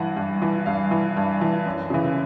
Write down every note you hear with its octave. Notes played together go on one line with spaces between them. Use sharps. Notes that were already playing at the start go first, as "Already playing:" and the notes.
Already playing: G2 E3 F#5
G2
E3
G2 F5
E3
G2
E3
F#2
C#3 E3